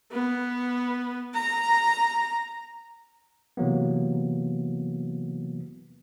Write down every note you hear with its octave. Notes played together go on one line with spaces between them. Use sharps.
B3
A#5
C3 E3 F#3 A#3 B3